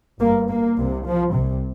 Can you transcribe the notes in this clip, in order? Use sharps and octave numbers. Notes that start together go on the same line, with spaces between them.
G1 G2 A#3
A#3
C2 C3
F3
C2 C3